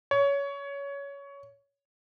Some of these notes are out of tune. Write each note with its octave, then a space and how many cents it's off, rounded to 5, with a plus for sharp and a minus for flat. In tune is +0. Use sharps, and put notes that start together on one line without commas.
C#5 +20